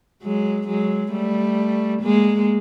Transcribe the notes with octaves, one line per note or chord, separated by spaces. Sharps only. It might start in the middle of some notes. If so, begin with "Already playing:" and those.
F#3 G#3
F#3 G#3
G3 A3
G#3 A#3